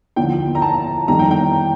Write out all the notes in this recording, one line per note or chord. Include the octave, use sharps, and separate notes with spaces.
D#2 D3 F3 G5
A#5
A5
F2 D#3 G3 A#5
G5
G5